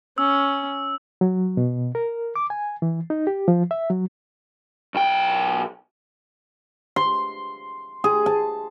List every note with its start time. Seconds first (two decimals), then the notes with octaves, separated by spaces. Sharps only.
0.18 C#4 E6
1.21 F#3
1.57 B2
1.95 A#4
2.36 D6
2.50 G#5
2.82 E3
3.10 D#4
3.27 G4
3.48 F3
3.71 E5
3.90 F#3
4.95 B1 G5
6.96 C6
8.04 G#4
8.26 A5